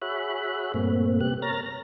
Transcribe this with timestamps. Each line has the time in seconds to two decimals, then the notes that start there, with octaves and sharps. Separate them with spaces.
0.02 F#4 G#4 C#5 E5 B5 F#6
0.74 G2 A#2 A3 A#3 C4
1.21 C3 B3 G4 F#6
1.42 A#4 C#5 A#5 F6 A6 A#6
1.66 A#6